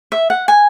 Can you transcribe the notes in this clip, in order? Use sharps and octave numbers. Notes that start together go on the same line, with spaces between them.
E5
F#5
G#5